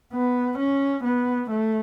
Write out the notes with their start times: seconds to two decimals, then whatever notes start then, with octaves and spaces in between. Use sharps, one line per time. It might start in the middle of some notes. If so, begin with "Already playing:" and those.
0.13 B3
0.58 C#4
1.04 B3
1.50 A3